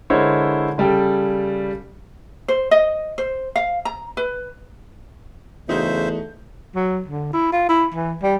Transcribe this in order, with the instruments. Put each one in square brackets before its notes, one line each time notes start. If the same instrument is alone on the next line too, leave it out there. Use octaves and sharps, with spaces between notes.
[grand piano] D3 G#3 E4 A#4 C5 C#5
C#3 G3 A4 G5
[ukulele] C5
D#5
C5
F5
A#5
B4
[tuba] E2 [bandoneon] C#3 C5 E5 [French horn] A3 [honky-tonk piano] D#4 F#4 G6
[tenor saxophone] F#3
D3
E4
F4
E4
E3
G3